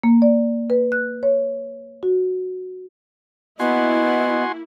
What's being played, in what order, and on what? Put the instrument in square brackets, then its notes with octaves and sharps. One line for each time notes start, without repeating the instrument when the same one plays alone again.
[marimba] A#3
D5
B4
F#6
C#5
F#4
[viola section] A#3 E4 [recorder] B3 [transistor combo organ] F#4 G#5 C6 [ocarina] D#5